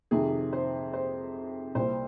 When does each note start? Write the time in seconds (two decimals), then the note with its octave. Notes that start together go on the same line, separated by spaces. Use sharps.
0.11 F2 C3 D#3 G#4
0.53 C5
0.93 C5
1.75 C2 A#2 C5